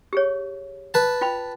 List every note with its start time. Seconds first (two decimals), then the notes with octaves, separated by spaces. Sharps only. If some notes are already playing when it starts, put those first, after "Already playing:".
0.13 G4 G#4 C#5
0.94 B4 A5
1.21 F4 G5 B5